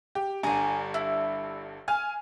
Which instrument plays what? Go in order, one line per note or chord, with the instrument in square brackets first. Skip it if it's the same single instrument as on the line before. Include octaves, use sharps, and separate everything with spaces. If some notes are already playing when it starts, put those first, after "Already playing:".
[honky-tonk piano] G4
[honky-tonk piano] G1 G2 [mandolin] G#5 A#5
[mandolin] E4
[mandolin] F5 [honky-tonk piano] G#5